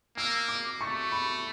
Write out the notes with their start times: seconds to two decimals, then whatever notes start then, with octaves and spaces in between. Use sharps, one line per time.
0.17 A#3 E6
0.48 D6
0.80 A3 C#6
1.12 B5